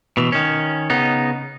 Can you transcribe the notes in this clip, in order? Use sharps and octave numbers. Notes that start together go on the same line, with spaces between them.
B2 E3
D#3 C#4
C#3 B3 D#4